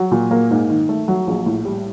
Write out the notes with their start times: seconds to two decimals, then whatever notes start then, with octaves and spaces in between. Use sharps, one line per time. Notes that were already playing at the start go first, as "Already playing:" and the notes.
Already playing: F#3
0.11 A#2
0.31 A#3
0.51 G#2
0.70 D#3
0.89 A3
1.08 F#3
1.27 A#1
1.46 A2
1.65 G3